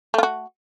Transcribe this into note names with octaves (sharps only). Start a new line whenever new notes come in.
A3 F4 F#4